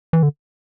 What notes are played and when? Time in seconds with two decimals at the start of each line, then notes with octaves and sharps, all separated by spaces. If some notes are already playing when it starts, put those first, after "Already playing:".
0.13 E3
0.23 D3